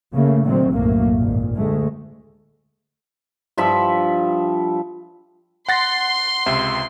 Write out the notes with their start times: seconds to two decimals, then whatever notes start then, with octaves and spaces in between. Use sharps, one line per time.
0.13 C#3 A3 A#3
0.45 A#2 D3 D#3 F#3 A3 C4
0.73 B1 F#2 A2 F#3 A3 A#3
1.17 G#1 A#2
1.53 D2 G#3 A3
3.58 G2 F3 E5 B5
5.69 F#5 C6 A6 A#6
6.46 C#2 C3 E5